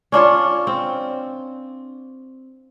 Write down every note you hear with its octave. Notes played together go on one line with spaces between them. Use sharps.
C#4 D4 F4 C#5
C4